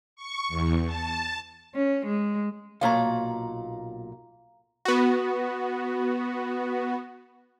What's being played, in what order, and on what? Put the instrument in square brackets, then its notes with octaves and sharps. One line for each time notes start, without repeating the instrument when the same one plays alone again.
[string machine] C#6
E2
A5
[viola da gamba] C#4
G#3
[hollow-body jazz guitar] B1 A#2 C#5 [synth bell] F5 A#5
[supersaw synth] B3 F#4